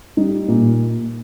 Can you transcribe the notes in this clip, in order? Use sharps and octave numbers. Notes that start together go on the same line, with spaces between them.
G3 D#4
A#2